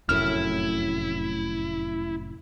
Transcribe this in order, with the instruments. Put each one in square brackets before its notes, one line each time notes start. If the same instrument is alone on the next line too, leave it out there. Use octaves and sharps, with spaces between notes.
[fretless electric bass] F1 F#2 A2 [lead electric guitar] E4 [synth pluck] F6